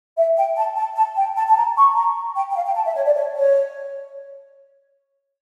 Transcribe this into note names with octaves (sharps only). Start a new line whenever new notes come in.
E5
G5
A5
A5
A5
G5
A5
A5
A#5
C#6
A#5
G5
G5
F5
G5
A5
E5
C#5
D5
C#5
C#5